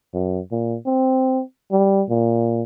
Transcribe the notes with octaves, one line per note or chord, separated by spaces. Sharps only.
F#2
A#2
C4
G3
A#2